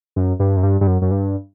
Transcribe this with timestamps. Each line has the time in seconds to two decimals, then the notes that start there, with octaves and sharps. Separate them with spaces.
0.16 F#2
0.40 G2
0.57 F#2
0.63 G2
0.81 G2
0.87 F#2
1.02 F#2
1.11 G2